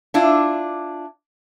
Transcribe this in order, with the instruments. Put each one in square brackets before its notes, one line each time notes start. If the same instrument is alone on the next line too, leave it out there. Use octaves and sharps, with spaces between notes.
[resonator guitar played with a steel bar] D4 E4 F4